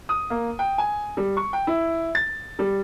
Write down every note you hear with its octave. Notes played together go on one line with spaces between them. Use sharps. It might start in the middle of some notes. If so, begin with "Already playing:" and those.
D#6
A#3
G5
G#5
G3
C#6
G5
E4
A6
G3